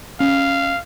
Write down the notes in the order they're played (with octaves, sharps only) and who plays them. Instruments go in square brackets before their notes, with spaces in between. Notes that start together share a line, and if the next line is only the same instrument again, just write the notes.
[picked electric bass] C#4 [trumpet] F5